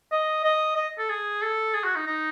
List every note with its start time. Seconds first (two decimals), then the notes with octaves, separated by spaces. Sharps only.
0.12 D#5
0.44 D#5
0.76 D#5
0.99 A4
1.09 G#4
1.42 A4
1.74 G#4
1.84 F#4
1.96 D#4
2.07 D#4